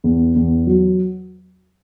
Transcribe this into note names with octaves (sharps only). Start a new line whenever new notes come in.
E2
E2
F#3